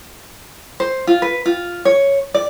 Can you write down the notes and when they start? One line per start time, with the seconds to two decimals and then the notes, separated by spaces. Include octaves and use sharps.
0.80 C5
1.07 F4
1.22 B4
1.45 F4
1.85 C#5
2.34 D5